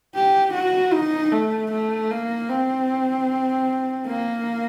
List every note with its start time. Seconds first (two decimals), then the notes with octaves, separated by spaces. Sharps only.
0.15 G4
0.54 F#4
0.93 D#4
1.32 A3
1.72 A3
2.11 A#3
2.49 C4
4.07 A#3